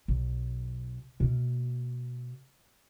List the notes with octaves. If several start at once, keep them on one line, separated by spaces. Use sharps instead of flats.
B1
B2 A#3